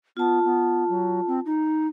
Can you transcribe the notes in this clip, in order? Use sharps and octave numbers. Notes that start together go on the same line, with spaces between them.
B3 F4 A5
B3
F#3
C4
D#4